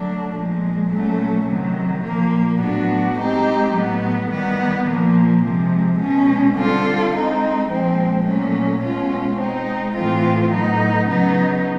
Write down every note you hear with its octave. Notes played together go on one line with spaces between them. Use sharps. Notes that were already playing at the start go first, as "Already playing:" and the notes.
Already playing: D3 F#3 A3 D4
A#2 F3 G#3
A#2 F#3 A3 C#4
C3 D#3 F#3
A#2 F3 A#3
A2 F#3 B3 D4 F#4
G#3 C4 D#4 G4
A2 F#3 B3
D#3 G3 B3
A#2 F3 A#3
C3 F3 G#3
B2 G#3 C#4
D3 G3 C4 F4 A4
G#3 C4 D#4
A#2 F3 G#3 C4
A#2 F#3 A3 C#4
B2 G#3 C#4 F4
G#3 C4 D#4
A2 E3 A3 C4 F4
A2 F#3 B3 D#4
C#3 F#3 B3 D#4